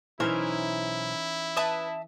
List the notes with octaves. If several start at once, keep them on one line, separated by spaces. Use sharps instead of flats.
B1 E3 C#4 D#4 E4 A#4 C5
B4 E5 A5 D#6